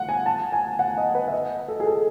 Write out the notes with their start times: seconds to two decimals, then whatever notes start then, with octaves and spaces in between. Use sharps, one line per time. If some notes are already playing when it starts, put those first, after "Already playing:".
Already playing: F#5
0.09 G#5
0.26 A5
0.52 G#5
0.79 F#5
0.98 D#5
1.15 B4
1.28 E5
1.33 D#5
1.68 A4
1.80 G#4
1.86 A4